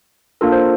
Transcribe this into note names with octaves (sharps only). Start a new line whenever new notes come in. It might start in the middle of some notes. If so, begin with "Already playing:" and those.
A#3 D4 F4 A4 A#4
C5